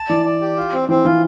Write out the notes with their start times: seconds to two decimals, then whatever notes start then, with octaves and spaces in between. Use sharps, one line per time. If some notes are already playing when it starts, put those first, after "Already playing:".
Already playing: A5
0.09 E3 D5
0.26 D5
0.41 G4
0.57 F4
0.73 C4
0.89 E3 C4
1.05 E3 F4